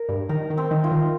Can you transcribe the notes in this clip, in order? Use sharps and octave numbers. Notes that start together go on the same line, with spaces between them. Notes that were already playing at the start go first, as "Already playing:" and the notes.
Already playing: A#4
G2
D#3 A#4
D#3
C4
D#3
F4
D#3